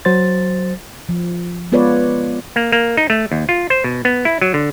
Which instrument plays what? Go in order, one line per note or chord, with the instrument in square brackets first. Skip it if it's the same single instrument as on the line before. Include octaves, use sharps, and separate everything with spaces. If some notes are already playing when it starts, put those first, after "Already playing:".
[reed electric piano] F#3 C5 A6
[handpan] F3
G#3 B3 F4 B4 C#5 D5
[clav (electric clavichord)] A#3
A#3
D#4
A3
D#2
F4
C5
B2
B3
E4
F#3
D3